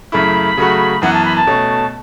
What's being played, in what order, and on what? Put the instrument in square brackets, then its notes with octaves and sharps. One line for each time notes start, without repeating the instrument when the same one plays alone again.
[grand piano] F#2 C#3 A3 E4 [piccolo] B5
[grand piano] C#3 F#3 A3 F#4
[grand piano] F#2 E3 B3 [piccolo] F#5
[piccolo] A5
B5
A5
[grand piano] B2 A3 C#4